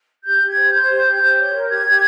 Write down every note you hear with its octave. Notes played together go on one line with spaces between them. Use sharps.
G4 G6
G4
G#6
C5
C5 G6
G4
G4
G4
C#5
A#4
G4 G#6
G4